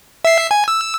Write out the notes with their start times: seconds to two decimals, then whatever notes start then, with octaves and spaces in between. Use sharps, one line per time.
0.25 E5 C7
0.51 G#5
0.68 E6